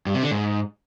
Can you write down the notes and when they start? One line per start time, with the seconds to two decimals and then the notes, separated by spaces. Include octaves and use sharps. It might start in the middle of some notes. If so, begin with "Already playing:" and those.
0.06 G2
0.15 C3
0.23 D3
0.31 G#2